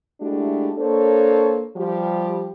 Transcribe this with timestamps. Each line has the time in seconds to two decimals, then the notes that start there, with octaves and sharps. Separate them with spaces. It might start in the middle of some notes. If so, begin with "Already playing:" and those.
0.21 G#3 A3 D4 E4 F#4 G4
0.78 A#3 D4 A4 C5 C#5
1.77 F3 G3 G4